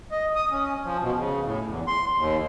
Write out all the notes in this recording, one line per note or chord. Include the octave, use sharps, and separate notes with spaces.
D#5
D#6
C#4
F3
B2
C#3
A2
E2
C6
D#2